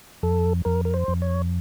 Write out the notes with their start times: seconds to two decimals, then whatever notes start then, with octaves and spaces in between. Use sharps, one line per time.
0.23 F2 A4
0.65 F2 A#4
0.85 A#4
0.94 C5
1.08 F2
1.22 C#5